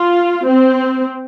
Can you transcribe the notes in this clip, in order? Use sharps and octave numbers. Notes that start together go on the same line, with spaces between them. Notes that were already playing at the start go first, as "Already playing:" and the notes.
Already playing: F4
C4